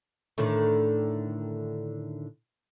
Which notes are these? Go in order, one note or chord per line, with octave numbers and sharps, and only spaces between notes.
A2 D3 D#3